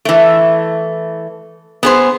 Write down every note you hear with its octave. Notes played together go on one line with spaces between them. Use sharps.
E3 A3
B3 G#4 C5